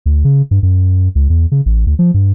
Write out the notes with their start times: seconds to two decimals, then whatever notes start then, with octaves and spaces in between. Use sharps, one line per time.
0.06 D2
0.25 C#3
0.51 G2
0.63 F#2
1.15 C#2
1.30 E2
1.52 C#3
1.66 A1
1.87 D2
1.99 F3
2.14 G2